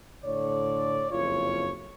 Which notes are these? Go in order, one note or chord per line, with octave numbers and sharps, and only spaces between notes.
A2 D3 C#5 D5
F#1 F2 F4 C#5